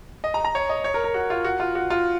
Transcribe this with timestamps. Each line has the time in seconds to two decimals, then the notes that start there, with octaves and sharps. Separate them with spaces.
0.24 D#5
0.34 A#5
0.45 A#5
0.55 C#5
0.69 D#5
0.84 C#5
0.94 A#4
1.04 A#4
1.14 F#4
1.30 F4
1.44 F#4
1.60 F4
1.75 F#4
1.90 F4